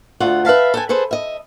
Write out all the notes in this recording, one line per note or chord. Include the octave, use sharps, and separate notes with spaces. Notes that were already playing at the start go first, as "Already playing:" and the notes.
D2 A3 F4 F#5
B4 E5 F5 A5
A4 G5 G#5
G#4 A4 B4 C5
D#5 E5